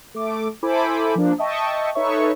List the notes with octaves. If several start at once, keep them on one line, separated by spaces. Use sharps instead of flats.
A3 D6
E4 A4 C5 G#5 B5 D6
F3 A#3 D4
D#5 E5 G5 A5 C#6
D#4 A4 B4 C#5 E5 C#6